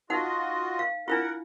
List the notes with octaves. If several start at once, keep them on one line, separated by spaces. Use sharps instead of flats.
D#4 F4 F#4 D#5 F#5
F5
D4 E4 F4 A#4 F#5